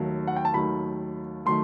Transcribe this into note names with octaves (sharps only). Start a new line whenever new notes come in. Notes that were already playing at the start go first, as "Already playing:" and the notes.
Already playing: D#2 D#3 F#3 A3
F#5
G5
A5
D#2 D#3 F#3 A3 B5
D#3 F#3 A3 C6